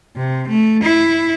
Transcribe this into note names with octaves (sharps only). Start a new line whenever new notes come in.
C3
A3
E4